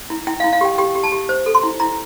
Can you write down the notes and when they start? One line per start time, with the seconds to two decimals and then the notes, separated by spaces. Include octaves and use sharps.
0.10 E4
0.27 E4 G5
0.40 F5
0.44 E4
0.53 F5
0.61 G4 G5
0.78 G4 G5
0.95 G4
1.03 A5
1.12 G4
1.29 C5
1.46 A4
1.55 C6
1.63 E4
1.80 E4 A#5